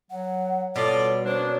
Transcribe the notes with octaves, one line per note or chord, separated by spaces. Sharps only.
F#3 F#5
B2 G3 F4 A4 C#5 D5
A#3 C#4 D4 C5 C#5